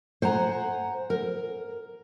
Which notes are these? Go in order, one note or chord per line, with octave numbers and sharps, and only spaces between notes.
C5 F#5 G#5 A#5
A#4